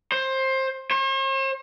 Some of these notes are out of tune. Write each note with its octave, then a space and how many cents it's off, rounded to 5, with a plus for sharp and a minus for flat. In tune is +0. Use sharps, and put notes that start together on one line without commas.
C5 +20
C5 +45